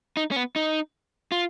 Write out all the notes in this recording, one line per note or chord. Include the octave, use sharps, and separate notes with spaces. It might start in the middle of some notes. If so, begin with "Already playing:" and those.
D#4
C#4
B3
D#4
F4